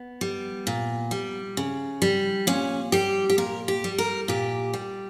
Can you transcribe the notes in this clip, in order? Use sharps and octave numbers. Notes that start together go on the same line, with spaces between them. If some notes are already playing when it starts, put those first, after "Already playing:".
Already playing: B3
G3
A#2
G3
C#3
G3
A#2 C#4
G3 G4
G4
A#2 A#4
G4
G3
A#4
A#2 G4
G3